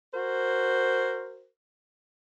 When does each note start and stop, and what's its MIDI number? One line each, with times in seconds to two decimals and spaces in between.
0.14 1.47 66
0.14 1.47 70
0.14 1.47 72